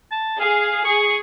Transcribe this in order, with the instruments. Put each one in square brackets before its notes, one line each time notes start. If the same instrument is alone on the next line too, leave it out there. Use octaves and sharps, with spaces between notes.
[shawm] A5
[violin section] G#4 [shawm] F5
[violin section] G#4 [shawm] C#6